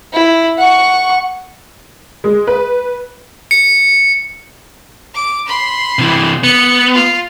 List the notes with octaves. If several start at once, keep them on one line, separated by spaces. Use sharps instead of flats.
E4
F#5 C#6
G#3
B4
C#7
D6
B5 C6
C3 E3
B3 C#7
F4